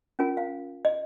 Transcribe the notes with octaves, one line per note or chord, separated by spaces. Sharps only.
C#4 F4 A#4 G#5
F5
D#5